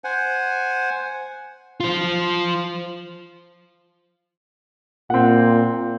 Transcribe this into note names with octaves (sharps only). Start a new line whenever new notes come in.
C5 F#5 G#5
F4 C5
A#2 C4 F#5